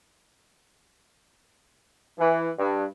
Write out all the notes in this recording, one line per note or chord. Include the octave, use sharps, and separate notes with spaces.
E3
G2